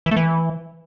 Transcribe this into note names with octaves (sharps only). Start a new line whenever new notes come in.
E3
A3
E3